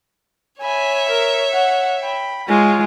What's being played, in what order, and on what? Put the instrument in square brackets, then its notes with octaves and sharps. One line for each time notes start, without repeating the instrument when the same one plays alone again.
[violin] C#5 E5 [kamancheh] G#5 B5
[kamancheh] A#4
F#5
G5 B5
[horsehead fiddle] G#3 F4 [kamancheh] C#5